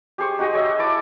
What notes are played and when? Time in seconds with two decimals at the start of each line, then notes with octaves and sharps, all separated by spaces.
0.18 G4 G#4 C5 C#6
0.39 D#4 F#4 G4 D#5
0.53 G#4 C#5 D#5 E5
0.79 E4 A5 D6